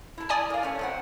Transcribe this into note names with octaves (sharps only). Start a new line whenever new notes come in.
E4 A5
D5 G#5 D#6
A#4 F5
A3 C#4
G#2 C4 F#5